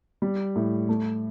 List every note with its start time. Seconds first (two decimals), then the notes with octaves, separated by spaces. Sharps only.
0.22 G3
0.56 A2
0.89 A3